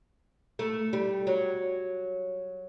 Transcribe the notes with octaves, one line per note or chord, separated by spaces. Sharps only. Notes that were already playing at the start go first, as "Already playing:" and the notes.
A3
G3
F#3